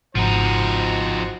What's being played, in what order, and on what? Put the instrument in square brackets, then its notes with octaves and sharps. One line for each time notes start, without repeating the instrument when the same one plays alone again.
[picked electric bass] G#1 [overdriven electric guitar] F3 D#4 [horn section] F#4 C5